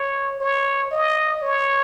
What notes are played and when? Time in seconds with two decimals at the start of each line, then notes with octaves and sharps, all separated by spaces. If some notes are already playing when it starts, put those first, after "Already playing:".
Already playing: C#5
0.40 C#5
0.91 D#5
1.42 C#5